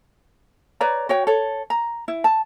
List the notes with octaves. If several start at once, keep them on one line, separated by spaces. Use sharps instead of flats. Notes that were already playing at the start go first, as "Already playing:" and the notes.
B4 C#5 D5 A#5
F#4 C#5 G5
A4 C#5
A#5
E4
A5